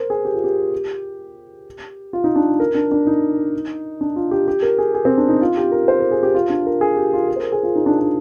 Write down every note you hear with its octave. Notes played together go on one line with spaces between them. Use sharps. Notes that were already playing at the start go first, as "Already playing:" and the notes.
Already playing: A#4 C5
G#4
G4
F4
G4
F4
D#4
D4
A#4
D4
D4
D#4
D4
F4
G4
G4
A#4
G#4
G#4
C4
D4
D#4
F4
G4
A#4
C5
A#4
G#4
G4
F4
D4
A#4
G#4
G4
F4
G#4
C5
A#4
G#4
F4
D#4
D4
D4